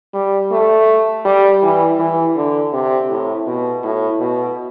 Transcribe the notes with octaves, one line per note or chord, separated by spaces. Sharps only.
G3
A3
G3
E3
E3
D3
C3
A2
B2
A2
B2